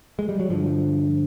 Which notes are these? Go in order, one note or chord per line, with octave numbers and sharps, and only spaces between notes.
G#3
G3
F#3
G2 D3 F3